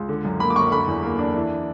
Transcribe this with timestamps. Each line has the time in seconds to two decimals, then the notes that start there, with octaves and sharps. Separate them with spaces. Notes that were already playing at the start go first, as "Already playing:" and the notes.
Already playing: C#2
0.09 D3
0.25 F#2
0.40 A#3 B5
0.50 D6
0.56 F#2 C#6
0.72 D3 B5
0.87 E2
1.03 A#3
1.19 D4
1.34 E3